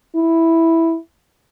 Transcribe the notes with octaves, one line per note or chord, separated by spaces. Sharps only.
E4